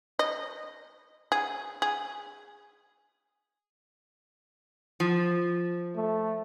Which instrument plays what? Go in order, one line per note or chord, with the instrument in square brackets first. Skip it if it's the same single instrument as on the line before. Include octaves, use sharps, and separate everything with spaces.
[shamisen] D#5
G#4
G#4
[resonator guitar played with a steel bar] F3
[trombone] A3